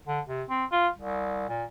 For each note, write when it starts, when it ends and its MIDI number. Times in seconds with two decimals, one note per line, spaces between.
0.07 0.20 50
0.27 0.43 48
0.49 0.65 60
0.72 0.88 65
0.98 1.46 36
1.48 1.63 46